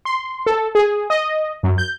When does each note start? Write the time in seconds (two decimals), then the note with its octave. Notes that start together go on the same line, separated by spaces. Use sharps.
0.05 C6
0.46 A4
0.75 G#4
1.10 D#5
1.63 F#2
1.78 G6